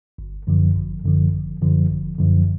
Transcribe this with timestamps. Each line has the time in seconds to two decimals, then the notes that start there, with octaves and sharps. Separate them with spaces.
0.18 G1
0.47 F#2 D3 F3
0.75 G1
1.04 F#2 D3 F3
1.33 G1
1.61 F#2 D3 F3
1.91 G1
2.19 F#2 D3 F3